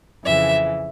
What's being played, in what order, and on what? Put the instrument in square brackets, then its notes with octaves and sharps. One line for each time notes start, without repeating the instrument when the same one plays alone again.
[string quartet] F2 C#3 E3 E5